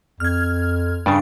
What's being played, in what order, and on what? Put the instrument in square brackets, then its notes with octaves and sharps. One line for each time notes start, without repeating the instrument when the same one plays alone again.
[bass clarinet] F2 [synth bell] F6 G#6
[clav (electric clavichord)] G2 C#3 [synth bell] D4